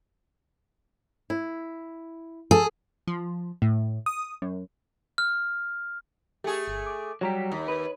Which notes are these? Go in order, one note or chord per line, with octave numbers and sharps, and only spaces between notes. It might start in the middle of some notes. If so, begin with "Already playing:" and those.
E4
G#4 A4
F3
A2
D#6
F#2
F6
A3 G4 G#4
G1
D6
F#3 G3 G4 C#5 A#5 B6
D#2
B4